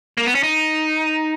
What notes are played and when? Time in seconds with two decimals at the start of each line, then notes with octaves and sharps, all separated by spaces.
0.17 A#3
0.26 B3
0.35 C#4
0.43 D#4